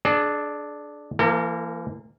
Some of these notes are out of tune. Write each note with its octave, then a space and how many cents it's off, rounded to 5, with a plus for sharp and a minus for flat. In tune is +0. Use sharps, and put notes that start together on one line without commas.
D4 +0 G#4 +40 D#5 -30
E3 +40 A#3 -10 A4 +45